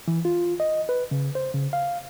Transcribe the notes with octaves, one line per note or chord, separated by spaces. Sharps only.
E3
F4
D#5
B4
C#3
C5
C#3
F5